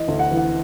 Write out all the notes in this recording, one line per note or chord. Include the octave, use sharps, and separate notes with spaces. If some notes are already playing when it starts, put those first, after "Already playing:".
Already playing: E3 D#5
D2
F#5
E3
F#5